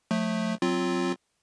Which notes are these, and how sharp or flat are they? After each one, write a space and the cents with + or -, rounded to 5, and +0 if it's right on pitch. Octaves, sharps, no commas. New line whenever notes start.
F3 +40 A3 +0
F#3 +0 C4 +0 F4 +0